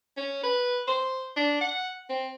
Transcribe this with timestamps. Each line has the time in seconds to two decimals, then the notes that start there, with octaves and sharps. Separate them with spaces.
0.17 C#4
0.44 B4
0.88 C5
1.37 D4
1.61 F#5
2.10 C4